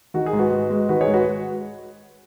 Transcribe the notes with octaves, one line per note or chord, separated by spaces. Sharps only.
D#3 F#4
G#4
G#2
F#4 B4
G#2
G#3
D#3 F#4 B4
G#4 C#5
G#2
F#4 B4